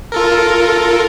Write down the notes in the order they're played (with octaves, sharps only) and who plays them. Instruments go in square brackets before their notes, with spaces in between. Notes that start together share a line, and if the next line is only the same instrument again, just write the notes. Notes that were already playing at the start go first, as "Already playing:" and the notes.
[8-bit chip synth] F4 A4 A#4